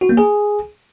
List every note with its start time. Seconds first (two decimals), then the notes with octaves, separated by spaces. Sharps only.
0.01 F#4
0.09 A#3
0.17 G#4